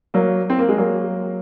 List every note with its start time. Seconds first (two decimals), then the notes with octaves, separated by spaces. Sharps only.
0.14 F#3 A#3
0.50 C4
0.59 A#3
0.69 G#3
0.78 F#3 A#3